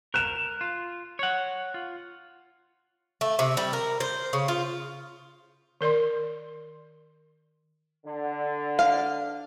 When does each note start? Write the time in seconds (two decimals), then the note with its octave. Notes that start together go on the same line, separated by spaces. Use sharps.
0.14 A#4 F#6 E7
0.61 F4
1.19 C#5 F#5
1.74 F4
3.21 A3
3.39 C3
3.57 G3
3.73 A#4
4.00 C5
4.33 C#3
4.48 F4
5.81 D#3 A#4 D5 C6
8.06 D3
8.79 F5